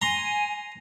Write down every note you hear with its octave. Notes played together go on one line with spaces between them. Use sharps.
G#5 A#5 C6